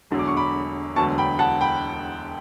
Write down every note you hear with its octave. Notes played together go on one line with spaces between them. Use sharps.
E1 E2 D3 F#3
D6
C#6
B5 D6
E1 D2 D3 F#3 B3 A5 C#6
G5 B5
F#5 A5
G5 B5